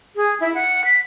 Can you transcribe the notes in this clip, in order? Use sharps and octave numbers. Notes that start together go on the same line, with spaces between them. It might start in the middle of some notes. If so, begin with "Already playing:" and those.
G#4
E4
F#5
B6